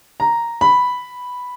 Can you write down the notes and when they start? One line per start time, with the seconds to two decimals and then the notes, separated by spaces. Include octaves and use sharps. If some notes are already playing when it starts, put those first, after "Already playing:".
0.20 A#5
0.61 B5